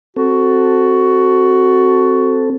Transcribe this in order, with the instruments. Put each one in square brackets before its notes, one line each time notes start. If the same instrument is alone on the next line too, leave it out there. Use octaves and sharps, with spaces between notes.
[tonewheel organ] C4 A4 [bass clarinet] F#4